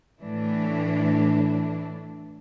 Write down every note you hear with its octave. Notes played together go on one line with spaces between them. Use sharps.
A2 E3 D4